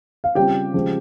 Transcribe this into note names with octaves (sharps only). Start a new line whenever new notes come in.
F5
C#3 G3 C4 F4 G4 G5
C#3 F3 G#3